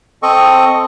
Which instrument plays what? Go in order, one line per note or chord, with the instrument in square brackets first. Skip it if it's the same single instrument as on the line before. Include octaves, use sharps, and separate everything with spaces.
[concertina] C4 A4 D#5 C#6